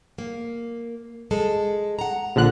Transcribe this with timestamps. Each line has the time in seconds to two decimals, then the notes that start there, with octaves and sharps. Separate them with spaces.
0.18 A#3
1.31 G#3 A4
1.99 F#5 A#5
2.36 A#1 D3 F#6